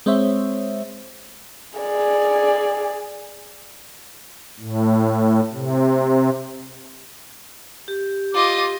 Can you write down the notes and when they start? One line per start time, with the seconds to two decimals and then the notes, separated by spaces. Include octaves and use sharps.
0.06 G#3 C4 C5 C#5 E5
1.79 G#4 D5
4.60 A2
5.53 C3
7.88 G4
8.34 F4 D#5 D6